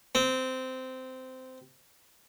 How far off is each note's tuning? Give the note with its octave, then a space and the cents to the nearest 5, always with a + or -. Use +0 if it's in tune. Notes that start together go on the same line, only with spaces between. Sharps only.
C4 -15